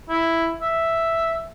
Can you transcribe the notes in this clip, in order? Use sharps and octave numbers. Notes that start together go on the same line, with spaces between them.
E4
E5